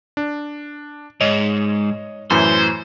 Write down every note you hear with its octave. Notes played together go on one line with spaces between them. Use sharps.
D4
G#2 C#5 D#5
F#2 A2 E3 C5